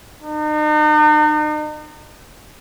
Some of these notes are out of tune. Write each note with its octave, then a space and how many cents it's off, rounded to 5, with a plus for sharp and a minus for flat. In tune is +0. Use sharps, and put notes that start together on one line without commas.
D#4 -40